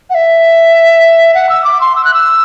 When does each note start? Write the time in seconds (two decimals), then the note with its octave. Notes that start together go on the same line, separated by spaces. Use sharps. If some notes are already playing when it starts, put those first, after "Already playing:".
0.10 F#5
0.14 E5
1.34 F#5
1.49 E6
1.64 D6
1.81 C6
1.95 E6
2.04 F#6
2.14 E6